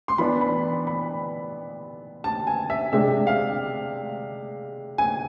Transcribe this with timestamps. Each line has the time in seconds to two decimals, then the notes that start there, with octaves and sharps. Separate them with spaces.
0.08 C6
0.18 E3 B3 D4 B5
0.41 B5
0.87 B5
2.24 A5
2.47 G#5
2.70 E5
2.93 C3 G#3 D4 E5
3.27 F5
4.98 G#5